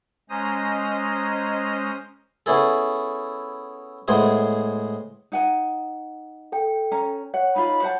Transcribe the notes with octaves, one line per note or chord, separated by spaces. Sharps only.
G#3 C#4 C5 D#5 A#5 D#6
B3 C#4 E4 G#4 A4
A2 G#3 B3 G#4 C5
D#4 F#5 G#5
A4 G5
C#4 A#5
C#5 F#5
D#4 F4 B5
C5 F#5 A5